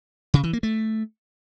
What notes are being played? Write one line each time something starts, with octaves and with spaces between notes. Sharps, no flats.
C#3
E3
A#3
A3